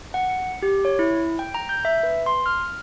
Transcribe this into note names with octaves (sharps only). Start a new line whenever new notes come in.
F#5
C#7
G4
C#5
E4
G5
A#5
G6
E5
B4
C6
F6